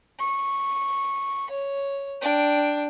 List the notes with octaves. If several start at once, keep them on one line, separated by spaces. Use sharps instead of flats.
C#6
C#5
D4 G5